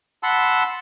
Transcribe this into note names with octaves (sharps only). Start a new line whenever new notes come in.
F#5 A5 B5 C6 E6